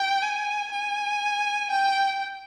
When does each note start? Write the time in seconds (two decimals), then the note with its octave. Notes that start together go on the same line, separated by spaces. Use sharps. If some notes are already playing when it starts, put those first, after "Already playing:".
Already playing: G5
0.22 G#5
0.71 G#5
1.70 G5